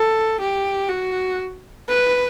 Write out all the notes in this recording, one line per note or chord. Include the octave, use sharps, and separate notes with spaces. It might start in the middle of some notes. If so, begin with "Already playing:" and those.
Already playing: A4
G4
F#4
B4